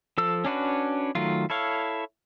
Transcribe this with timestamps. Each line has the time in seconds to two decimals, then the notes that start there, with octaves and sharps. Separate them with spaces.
0.18 F3 A4 E6
0.45 C#4 D4 F#4 B4
1.15 D#3 F#3 A3 F4
1.50 E4 A4 C#5 F5